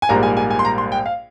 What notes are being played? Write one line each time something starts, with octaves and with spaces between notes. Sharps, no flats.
G#5
A#1 G#2 G3 A#3 A#5
G#5
G#5
G#5
C6
A#5
C6
G5
F5